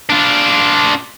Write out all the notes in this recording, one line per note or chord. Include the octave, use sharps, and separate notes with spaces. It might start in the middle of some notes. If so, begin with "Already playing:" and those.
D4 F4